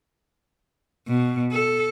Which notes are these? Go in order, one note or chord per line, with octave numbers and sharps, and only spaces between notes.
B2
A4